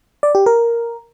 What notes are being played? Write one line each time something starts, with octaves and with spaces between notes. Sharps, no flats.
D5
G4
A#4